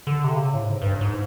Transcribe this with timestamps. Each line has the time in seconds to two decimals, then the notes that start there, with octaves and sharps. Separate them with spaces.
0.07 D3
0.24 C3
0.35 C#3
0.54 A2
0.63 G#2
0.82 G2
1.01 G#2